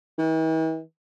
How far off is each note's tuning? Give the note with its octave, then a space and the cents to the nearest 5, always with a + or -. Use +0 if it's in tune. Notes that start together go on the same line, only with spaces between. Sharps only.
E3 -45